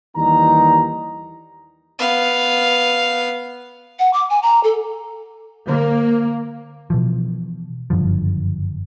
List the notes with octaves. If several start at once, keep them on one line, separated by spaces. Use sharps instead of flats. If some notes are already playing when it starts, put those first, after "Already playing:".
D#2 E3 G3 D#4 A#5
B3 F5
F#5
D6
G#5
A#5
A4
D3 A#3
B2 E3 F3
F#1 G2 D3 F3